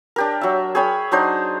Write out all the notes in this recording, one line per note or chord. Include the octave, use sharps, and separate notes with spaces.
D4 G4 A#4
F#3 E5
G#4 C#5 G5 B5
F#3 D4 D#4 C5